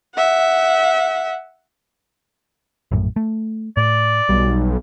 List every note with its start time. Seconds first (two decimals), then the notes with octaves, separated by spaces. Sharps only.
0.15 E5 F#5
2.92 A#1 F#2 A2
3.16 A3
3.77 A2 D5
4.29 B1 G3